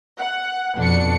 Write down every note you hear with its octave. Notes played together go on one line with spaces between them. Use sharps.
F#5
F2 B2 D4 C#7